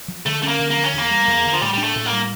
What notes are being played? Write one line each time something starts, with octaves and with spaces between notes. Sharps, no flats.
F3
D3 A3
A3 C#4
A#3
D3
A#3
F3
C#4
E2 A#3
G3
E2
D3
F3
A2 G3
G3 D4
A3
A2
A#3
G3